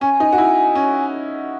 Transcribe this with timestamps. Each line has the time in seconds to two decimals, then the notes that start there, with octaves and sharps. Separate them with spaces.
0.01 C#4 G#5
0.20 D#4
0.32 F#4
0.38 E4
0.75 C#4